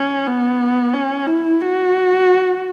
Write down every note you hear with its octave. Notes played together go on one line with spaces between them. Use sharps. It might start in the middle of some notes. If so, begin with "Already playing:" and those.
Already playing: C#4
B3
C#4
E4
F#4